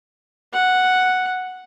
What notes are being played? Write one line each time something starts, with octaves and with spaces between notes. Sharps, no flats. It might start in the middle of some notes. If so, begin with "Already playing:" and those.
F#5